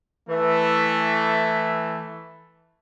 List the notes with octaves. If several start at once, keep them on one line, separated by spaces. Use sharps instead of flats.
E3 A3